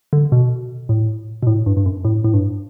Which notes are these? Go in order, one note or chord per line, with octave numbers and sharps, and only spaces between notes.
D3
B2
A2
B2
A2
G2
G2
F#2
A2
A2
G2